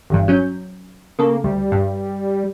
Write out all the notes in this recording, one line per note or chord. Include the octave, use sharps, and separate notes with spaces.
G1 E2 G2
F#3 C#4 G6
C#3 A#3 A4
D2 G3
G2